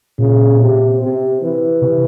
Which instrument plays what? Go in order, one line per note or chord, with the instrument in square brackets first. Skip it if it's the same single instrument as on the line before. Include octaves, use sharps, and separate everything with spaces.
[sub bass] A#2 [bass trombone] C#3
[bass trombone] C3
C3
E3
[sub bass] C3